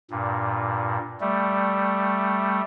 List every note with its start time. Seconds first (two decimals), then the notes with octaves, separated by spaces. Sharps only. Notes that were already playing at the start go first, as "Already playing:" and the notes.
0.11 G2 A#2
1.21 G3 A3